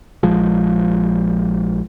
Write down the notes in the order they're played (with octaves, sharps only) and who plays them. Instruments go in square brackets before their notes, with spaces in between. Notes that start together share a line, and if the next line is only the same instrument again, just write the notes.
[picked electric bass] A#1 F3 G#3